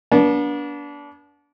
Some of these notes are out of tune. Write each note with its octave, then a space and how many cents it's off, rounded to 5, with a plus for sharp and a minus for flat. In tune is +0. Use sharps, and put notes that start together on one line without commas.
B3 -45 D4 -25